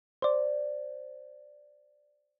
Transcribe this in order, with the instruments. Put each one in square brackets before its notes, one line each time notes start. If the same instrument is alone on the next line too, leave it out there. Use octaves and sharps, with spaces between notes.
[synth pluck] C5 D5